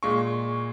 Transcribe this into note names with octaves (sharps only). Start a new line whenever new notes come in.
A#2 G#3 C#6